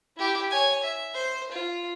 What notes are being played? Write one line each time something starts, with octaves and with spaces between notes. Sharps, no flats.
E4 G4
C#5 G#5
E5
C5
F4